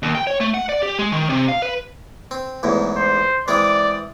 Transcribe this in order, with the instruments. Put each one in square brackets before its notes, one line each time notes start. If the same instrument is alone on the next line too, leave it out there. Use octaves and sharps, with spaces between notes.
[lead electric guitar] D#2
G5
C#5
A3
F#5
D5
G4
G#3
D#3
C3
F5
B4
[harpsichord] C4
A1 E2 G#2
[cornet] C5
[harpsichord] E3 G#3 C4 [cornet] D5